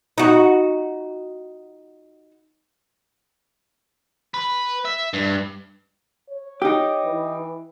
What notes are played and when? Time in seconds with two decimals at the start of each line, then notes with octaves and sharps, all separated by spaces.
0.18 D#4 F#4
4.34 B4
4.85 E5
5.13 G2
6.28 C#5
6.62 D#4 G4
7.04 E3